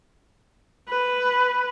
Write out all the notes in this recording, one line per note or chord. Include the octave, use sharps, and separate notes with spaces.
B4